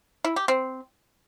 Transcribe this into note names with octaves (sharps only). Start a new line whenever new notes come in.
E4
G4
C4